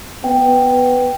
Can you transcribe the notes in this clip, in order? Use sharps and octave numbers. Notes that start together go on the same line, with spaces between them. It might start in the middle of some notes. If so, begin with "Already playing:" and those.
B3 G5